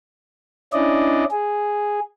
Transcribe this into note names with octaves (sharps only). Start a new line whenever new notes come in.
C#4 D4 E4 D5 D#5
G#4